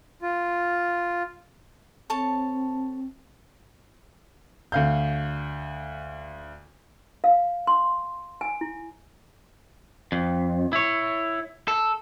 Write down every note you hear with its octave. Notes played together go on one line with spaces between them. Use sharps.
F4
C4 A4 C#5 A5
D2 F5 G6
F5
C6
G#5
E4
F2
E4 C#5
A4